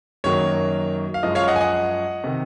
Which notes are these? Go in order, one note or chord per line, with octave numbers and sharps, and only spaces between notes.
F#2 D#3 F#3 A#3 C#5
F5
F#2 F3 G#3 D#5
C#5 F5
D#5 F#5
G#5
D#5 F#5
C3 D#3